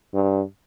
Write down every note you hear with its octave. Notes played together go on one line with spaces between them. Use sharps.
G2